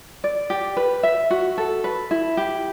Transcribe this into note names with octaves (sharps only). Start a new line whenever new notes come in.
D5
G4
B4
E5
F#4
A4
B4
E4
G4